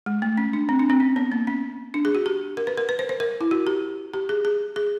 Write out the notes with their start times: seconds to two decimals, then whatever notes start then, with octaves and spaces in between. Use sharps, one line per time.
0.06 G#3
0.22 A3
0.38 C#4
0.53 D4
0.69 C4
0.79 D4
0.90 C4
1.00 C#4
1.16 B3
1.32 A#3
1.47 C#4
1.94 D4
2.05 G#4
2.15 F#4
2.26 G4
2.57 A#4
2.67 B4
2.77 A#4
2.89 B4
2.99 C5
3.09 C5
3.20 A#4
3.41 E4
3.51 F#4
3.67 G4
4.14 G4
4.29 G#4
4.45 G#4
4.76 G#4